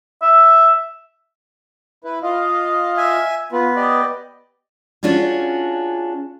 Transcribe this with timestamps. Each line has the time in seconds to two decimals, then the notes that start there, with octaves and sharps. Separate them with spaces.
0.22 E5
2.04 E4 B4
2.23 F4 D#5 F5
2.97 E5 G#5
3.52 B3 F4
3.76 G4 D5 D#5
5.03 C#4 D4 F4 F#4 G#4